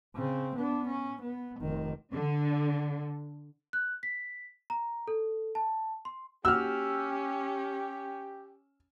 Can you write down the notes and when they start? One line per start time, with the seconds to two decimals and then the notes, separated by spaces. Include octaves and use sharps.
0.16 C#3 C4
0.56 B3 D4
0.87 C#4
1.21 B3
1.61 F1 D#3
2.13 D3
3.73 F#6
4.03 B6
4.70 A#5
5.08 A4
5.55 A5
6.05 C6
6.45 A#3 C#4 F#4 G4 F#5 E6 F6